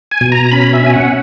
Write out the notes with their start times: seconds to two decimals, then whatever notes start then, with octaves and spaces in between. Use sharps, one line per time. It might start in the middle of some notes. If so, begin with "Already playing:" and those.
0.11 G#5
0.21 B2
0.32 A#5
0.51 C#4 B5
0.73 E5
0.83 C#4 G#5
0.93 F#5